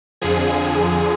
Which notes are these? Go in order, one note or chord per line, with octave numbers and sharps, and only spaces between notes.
F2 D3 F3 G#4